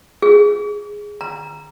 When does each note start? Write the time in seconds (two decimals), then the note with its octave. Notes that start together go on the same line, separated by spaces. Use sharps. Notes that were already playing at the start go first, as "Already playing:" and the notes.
0.22 G#4
1.21 A#5